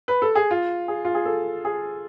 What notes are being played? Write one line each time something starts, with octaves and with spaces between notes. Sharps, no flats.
B4
A4
G#4
F4
G#4
F4
G#4
A4
G#4